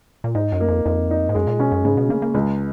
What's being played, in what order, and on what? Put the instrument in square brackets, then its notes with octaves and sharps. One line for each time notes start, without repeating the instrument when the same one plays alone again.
[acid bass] A#2
[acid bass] G#2 [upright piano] D#4
[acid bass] F#2
[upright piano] A#3
[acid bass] F2
[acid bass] F2 [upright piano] D#4
[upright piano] D#4
[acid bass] G#2
[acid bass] F#2 [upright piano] G#3
[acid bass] A#2
[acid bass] B2 [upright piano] C#4
[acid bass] F#2
[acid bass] G#2 [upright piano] C#3
[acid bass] B2
[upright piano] C#3 [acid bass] A#3
[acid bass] A#3
[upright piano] C#2 [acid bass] G#3